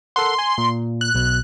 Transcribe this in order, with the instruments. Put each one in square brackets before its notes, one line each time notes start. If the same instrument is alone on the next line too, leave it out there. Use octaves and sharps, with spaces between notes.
[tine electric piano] A4 A#4 F#5 [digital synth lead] C6
[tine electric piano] G#5
A#2
[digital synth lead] F#6
[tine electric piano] B1 B2